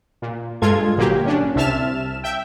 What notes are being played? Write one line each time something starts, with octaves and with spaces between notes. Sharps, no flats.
A#2
G2 G#3 F4 A4 G#6
G1 A#2 F#3 A#3 G4
C#4 D4
C2 C3 E5 A5 F6 E7
E5 G5